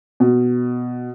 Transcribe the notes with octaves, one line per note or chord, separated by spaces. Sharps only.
B2